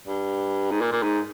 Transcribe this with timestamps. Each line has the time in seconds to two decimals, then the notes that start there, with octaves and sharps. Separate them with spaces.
0.07 G2
0.71 G#2
0.81 A#2
0.92 A#2
1.03 G#2